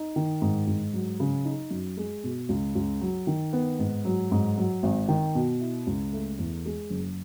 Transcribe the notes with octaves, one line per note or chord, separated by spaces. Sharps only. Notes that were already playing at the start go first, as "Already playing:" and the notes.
Already playing: D#4
D#3
G#2
G#2
F#3
C#3
D#4
F#2
G#3
B2
C#2
C#2
F#3
D#3
B3
G#2
F#3
G#2
F#3
G#1
D#3
B2
E4
C#2
A3
E2
G#3
F#1